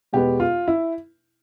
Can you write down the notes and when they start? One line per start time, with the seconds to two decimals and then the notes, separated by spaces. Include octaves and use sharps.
0.13 E2 B2 G#3 B3 G4
0.40 F4
0.68 E4